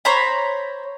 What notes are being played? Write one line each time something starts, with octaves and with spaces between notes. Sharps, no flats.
C5 C#5 A#5 B5